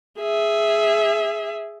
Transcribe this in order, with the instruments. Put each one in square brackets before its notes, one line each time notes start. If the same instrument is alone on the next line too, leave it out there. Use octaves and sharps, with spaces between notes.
[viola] G#4 E5